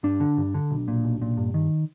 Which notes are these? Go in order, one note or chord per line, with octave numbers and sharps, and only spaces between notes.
G2 D4
D3
G2
D3
B1
A#2
B1
A#2
G2
D#3